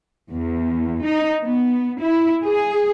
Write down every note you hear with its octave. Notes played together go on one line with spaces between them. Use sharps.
E2
D#4
B3
E4
G#4